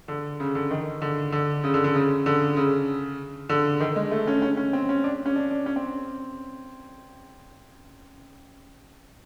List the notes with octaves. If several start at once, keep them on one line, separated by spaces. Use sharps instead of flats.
D3
C#3
D3
D#3
D3
D3
C#3
D3
D3
C#3
D3
C#3
D3
D#3
G#3
A3
C#4
C#4
C#4
C4
C#4
D4
C#4
D4
D4
C#4
C4